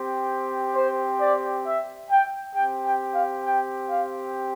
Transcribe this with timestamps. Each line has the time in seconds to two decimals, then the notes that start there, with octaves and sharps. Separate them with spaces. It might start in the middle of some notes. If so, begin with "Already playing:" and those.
Already playing: C4 G4
0.76 C5
1.21 D5
1.66 E5
2.10 G5
2.55 C4 G4 G5
2.85 G5
3.14 F5
3.44 G5
3.90 F5